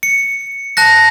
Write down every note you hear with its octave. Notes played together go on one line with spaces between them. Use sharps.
C#7
A5 F#6 A#6